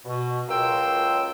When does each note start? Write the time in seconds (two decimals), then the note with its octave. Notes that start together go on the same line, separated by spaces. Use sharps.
0.05 B2
0.49 C#2 F#3 A#3 F4 G5 E6